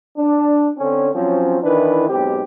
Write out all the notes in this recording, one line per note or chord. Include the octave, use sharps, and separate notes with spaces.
D4
D3 C4 C#4
F3 F#3 C4 C#4
D#3 E3 D4 E4 B4
B1 G#2 C4 G4